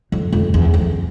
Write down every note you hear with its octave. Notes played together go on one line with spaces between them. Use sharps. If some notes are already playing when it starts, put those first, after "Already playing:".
F2
F2
E2
F2